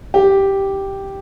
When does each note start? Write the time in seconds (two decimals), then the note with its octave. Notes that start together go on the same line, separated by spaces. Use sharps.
0.14 G4